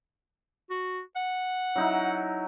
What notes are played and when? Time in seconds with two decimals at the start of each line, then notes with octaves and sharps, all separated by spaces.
0.71 F#4
1.16 F#5
1.76 F#3 D#4 E4